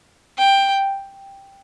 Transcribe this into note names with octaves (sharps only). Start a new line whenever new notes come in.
G5